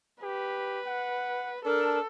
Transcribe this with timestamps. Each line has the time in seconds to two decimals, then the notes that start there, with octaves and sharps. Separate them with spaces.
0.23 G4 B4
0.86 F#5
1.65 D4 A4 A#4